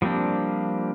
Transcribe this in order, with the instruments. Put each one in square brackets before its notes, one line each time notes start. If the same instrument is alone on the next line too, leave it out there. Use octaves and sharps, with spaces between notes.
[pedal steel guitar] F3 G3 A#3 C4 D4